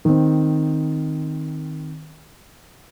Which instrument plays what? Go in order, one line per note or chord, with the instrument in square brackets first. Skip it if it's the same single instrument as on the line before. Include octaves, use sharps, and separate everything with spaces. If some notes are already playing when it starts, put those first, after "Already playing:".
[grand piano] D#3 C4